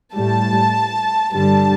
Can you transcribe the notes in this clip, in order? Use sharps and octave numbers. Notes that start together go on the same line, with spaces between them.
A2 G3 A5
G2 D3 G3 A5